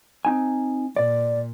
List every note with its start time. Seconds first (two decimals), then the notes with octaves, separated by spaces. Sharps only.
0.25 C4 D#4 G#5
0.96 A#2 D5